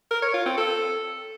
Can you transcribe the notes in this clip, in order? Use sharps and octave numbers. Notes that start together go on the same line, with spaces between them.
A#4
C#5
F4
C4
A4